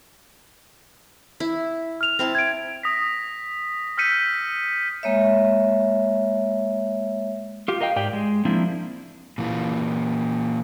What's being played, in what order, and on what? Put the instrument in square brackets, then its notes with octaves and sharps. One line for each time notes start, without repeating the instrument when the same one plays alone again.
[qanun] E4
[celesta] F6 F7
[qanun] C4 E4 A5
[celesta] G#6 D7
[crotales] D#6 A#6 B6
E6 F6 G6 B6 C#7 D#7
[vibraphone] G#3 A#3 C#5 E5
[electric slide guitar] F4 G4
A#4 D#5 F5 G5
G#2 G4 D5 G5
G#3
F3 A#3 C4 D4 E4
A#2 E3 A#3